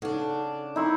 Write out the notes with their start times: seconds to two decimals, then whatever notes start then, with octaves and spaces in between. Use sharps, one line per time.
0.02 C#3 D4 D#4 A4 F#5
0.76 D#4 E4 C5 C#6